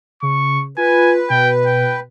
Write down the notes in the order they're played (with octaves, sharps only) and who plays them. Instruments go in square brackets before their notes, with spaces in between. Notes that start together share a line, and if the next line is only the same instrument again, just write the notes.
[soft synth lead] C#3 [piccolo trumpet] C#6
[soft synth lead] F4 [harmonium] B4 [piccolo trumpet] G#5
[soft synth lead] B2 [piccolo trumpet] G5
[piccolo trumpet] G5